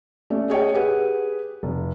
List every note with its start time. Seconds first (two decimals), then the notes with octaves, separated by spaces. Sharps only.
0.30 A3 C#4 D5
0.50 G#4 C#5 D#5 G5
0.74 G4 G#4 B4 F#5
1.63 F1